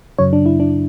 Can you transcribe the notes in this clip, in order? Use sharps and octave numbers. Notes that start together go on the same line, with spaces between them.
F#2 C#3 F#3 C#5
D4
E4
D4